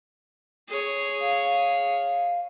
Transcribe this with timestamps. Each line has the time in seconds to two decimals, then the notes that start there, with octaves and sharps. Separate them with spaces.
0.69 G#4 C#5
1.21 F5